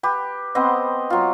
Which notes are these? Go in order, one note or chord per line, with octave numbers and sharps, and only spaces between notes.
G4 B4
B3 C4 C5 D#5
F#3 F4